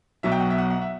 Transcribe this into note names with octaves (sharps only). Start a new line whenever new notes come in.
B1 B2 F#3 E5
G5
F#5
E5
F#5
F#5
E5